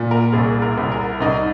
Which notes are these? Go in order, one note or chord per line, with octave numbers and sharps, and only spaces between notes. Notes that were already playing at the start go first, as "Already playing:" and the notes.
Already playing: A#2
A#4
C2 G#4
A#4
C2
A#4
C2 D#4